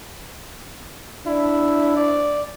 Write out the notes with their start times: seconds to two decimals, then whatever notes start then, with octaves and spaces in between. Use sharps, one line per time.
1.27 D4 E4
1.96 D5